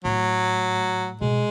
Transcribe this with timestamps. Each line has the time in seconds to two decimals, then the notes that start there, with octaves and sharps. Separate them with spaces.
0.04 A2 F#3
1.21 B2 G#3